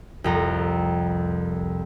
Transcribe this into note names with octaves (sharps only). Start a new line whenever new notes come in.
C2 F2 A#5